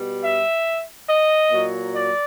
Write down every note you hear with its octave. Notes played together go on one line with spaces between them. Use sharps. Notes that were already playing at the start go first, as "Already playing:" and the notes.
Already playing: B2 G3
E5
D#5
A#2 F#3
D5